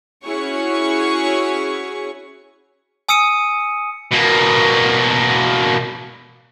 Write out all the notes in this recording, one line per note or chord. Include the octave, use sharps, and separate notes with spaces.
C#4 E4 F#4 G#4 C#5 C#6
G#5 D#6 E6 C#7 D#7
B2 A#3